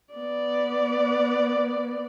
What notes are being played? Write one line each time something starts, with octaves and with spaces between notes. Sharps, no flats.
B3 D5